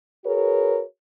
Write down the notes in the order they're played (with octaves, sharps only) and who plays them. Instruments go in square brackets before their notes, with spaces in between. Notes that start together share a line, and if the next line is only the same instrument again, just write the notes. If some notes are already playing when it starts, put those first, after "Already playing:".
[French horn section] F#4 G#4 A#4 B4 C#5